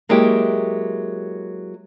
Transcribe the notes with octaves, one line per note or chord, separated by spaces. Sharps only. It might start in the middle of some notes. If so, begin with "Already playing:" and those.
F#3 G#3 A#3 E4 G4